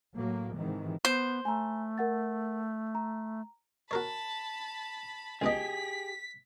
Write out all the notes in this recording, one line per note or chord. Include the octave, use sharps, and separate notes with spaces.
A2 F#3 A#3
G#2 C3 D#3 E3
B3 C5 G6
A3 G#5 A#5
A#4 F#5 A6
A#5
F#4 A#4 C#5 A5 B5
C#2 B3 G4 G#4 D#5 B6